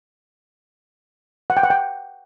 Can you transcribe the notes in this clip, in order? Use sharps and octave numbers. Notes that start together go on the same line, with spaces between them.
F#5
G5
F#5
G5